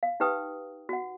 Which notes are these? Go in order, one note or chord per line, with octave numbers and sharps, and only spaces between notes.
F5
D#4 G4 B4 G5 D#6
F#4 F#5